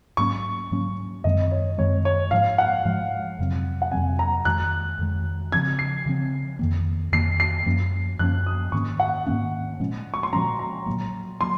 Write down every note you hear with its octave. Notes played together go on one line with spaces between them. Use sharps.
G#2 F#3 A#3 C#4 C#6
G#2 F#3 A#3 C#4
F#2 D#3 G#3 C4 D#5
C#5
F#2 D#3 G#3 C4 C#5
C#5
G#2 F3 G#3 F5
F#5
G#2 F3 G#3
F2 C3 F#3 C4
F#5
F2 C3 F#3 C4 G#5
A#5
F2 D#3 G#3 F#6
F2 D#3 G#3
C#3 F3 C4 G#6
C7
C#3 F3 C4
F2 D#3 A#3
F2 D#3 A#3 C7
C7
F#2 F3 A#3 C#4
F#2 F3 A#3 C#4 F#6
D#6
G#2 D#3 A#3 C#4 C#6
F#5
G#2 D#3 A#3 C#4
A#2 F3 G#3 C#4
C#6
C6
A#2 F3 G#3 C#4 A#5
A#5
A#2 F#3 A#3
F#3 A#3 C6